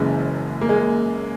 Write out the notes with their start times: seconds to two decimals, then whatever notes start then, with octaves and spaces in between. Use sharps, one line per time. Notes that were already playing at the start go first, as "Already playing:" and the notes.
Already playing: F#1 F#2 C#3 E3 G#3
0.61 A#3
0.69 G#3